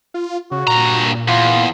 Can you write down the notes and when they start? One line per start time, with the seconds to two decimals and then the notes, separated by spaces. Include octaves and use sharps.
0.14 F4
0.51 C#3 F#4
0.67 G2 A#2 A#5
1.28 E2 F4